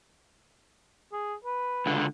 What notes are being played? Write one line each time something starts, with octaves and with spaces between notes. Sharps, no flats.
G#4
B4
C#2 D3